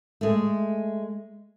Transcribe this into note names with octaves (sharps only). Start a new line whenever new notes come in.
G#3 A3